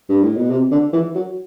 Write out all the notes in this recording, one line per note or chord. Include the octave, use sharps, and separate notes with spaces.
G2
A2
B2
C3
D3
E3
F#3